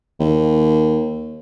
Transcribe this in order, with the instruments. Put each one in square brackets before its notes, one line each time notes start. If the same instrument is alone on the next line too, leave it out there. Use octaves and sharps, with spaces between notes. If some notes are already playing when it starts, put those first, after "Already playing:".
[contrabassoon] D#2